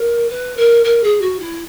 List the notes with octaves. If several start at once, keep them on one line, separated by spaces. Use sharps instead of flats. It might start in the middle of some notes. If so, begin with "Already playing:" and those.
Already playing: A#4
B4
A#4
A#4
G#4
F#4
E4